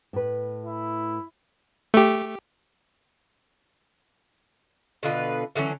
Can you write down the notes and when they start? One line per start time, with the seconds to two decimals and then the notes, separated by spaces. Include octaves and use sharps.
0.13 A2 B4
0.66 E4
1.94 A3 G4
5.03 B2 D3 F4 B4
5.55 D3 E3 F#3 C#4